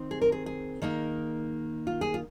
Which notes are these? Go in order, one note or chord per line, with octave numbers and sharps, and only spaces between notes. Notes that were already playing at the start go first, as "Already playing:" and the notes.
Already playing: D#3 C4 D#4
G#4
A#4
G#4
G#4
D#3 A#3 D#4
F4
G#4
F4